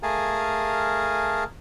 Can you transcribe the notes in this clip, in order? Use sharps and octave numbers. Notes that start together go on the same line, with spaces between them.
A3 G#4 A#4 F5 G#5 A5